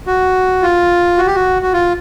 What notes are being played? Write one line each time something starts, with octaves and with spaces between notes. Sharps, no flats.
F#4
F4
F#4
G4
F#4
F#4
F4